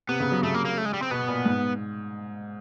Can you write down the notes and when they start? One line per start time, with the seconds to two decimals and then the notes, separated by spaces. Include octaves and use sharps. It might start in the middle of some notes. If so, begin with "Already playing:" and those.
0.09 C3 B3
0.20 C#3
0.32 F#3
0.43 C#3 A3
0.54 A#3
0.65 A#3
0.78 A3
0.85 G#3
0.94 G3
1.02 C4
1.11 B2 B3
1.28 A#2
1.46 G#2